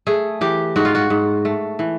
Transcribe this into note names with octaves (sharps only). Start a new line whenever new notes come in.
A3 G#4
E3 G4
G#2 F#4
F4
F#4
G#2
A3
E3